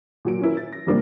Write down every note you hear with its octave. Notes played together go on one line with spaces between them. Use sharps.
A#2 F#3 D7
C#4 E4 A#4
A6
A#6
F2 C3 G3 A#3 C4 D4